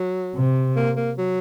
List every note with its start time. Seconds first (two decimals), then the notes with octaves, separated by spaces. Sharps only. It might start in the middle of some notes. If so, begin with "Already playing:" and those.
Already playing: F#3
0.35 C3
0.76 A#3
0.97 A#3
1.18 F#3